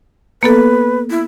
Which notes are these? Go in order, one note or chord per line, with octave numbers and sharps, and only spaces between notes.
A#3 B3 A4 B4
E4